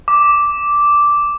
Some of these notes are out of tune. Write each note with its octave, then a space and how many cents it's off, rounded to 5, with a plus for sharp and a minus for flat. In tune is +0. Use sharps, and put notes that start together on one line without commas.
D6 -5